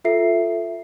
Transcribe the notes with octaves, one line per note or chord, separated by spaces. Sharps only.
F4 A4 E5 C7